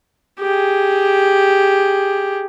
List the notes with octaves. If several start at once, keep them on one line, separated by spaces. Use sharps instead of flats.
G4 G#4